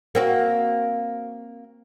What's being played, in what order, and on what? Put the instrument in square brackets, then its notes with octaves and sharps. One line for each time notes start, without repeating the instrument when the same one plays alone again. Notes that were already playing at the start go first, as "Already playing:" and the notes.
[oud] A#3 C4 F#4